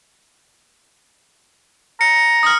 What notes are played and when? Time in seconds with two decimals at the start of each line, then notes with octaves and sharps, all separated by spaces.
2.01 A#5 C#7
2.43 D#6 F6